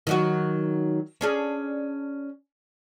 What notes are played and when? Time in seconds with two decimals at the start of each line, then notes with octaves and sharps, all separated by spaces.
0.07 D#3 F#3 F#4
1.21 C#4 D4 G#4